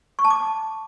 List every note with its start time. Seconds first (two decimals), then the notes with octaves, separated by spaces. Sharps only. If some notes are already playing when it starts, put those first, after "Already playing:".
0.19 C#6
0.25 A5
0.30 D6